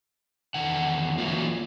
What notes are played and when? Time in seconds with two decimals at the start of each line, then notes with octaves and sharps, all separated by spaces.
0.54 E2 D3 D#3 F#5
1.18 E3 F#3 A3 A#3 F4